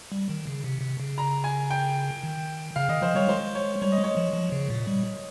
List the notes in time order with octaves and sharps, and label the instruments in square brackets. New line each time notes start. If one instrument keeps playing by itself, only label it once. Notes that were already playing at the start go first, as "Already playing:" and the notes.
[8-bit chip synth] G3
D#3
C#3
C3
C3
C#3
[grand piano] A#5
G#5
G5
[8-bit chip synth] D#3
[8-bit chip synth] C#3 [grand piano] F5
[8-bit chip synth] D#3 [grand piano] D#5
[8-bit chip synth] F3 [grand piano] C5
[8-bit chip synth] G3 [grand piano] C#5
[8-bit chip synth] G#3 [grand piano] C5
[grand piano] C#5
[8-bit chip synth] G3 [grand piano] C#5
[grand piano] D#5
[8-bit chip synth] G#3
[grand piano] C#5
[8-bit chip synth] F3
F3
C#3
A#2
G3